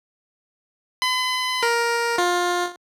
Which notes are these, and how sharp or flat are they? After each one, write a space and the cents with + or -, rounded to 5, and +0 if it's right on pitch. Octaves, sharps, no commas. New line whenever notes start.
B5 +45
A#4 +10
F4 +20